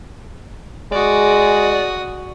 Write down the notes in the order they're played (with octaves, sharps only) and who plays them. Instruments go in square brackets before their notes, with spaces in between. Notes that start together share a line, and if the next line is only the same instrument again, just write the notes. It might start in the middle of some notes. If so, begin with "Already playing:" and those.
[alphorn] G#3 [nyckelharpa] F#4 D#6 [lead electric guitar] D5